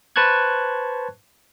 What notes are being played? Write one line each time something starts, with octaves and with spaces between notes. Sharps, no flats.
B4 C5 A5 C#6 F#6 G#6